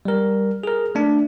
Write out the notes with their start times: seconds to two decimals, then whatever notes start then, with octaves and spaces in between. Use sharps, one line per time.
0.05 G3 A#4
0.63 G#4 A#4
0.95 A3 D4